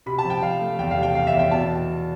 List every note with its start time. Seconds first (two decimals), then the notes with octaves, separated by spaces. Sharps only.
0.06 C3 B5
0.18 A5
0.25 F3
0.30 G5
0.42 F3 F5
0.61 A3
0.79 E2 G5
0.91 F5
0.97 C3
1.03 G5
1.15 C3 F5
1.27 E5
1.33 E2
1.39 G5
1.51 B2 A5